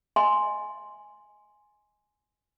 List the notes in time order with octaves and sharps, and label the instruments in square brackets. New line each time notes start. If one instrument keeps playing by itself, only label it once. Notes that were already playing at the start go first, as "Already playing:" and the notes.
[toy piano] D#5 G#5 C6